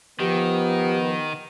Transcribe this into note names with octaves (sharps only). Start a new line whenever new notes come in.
D#3 F3 B3 G4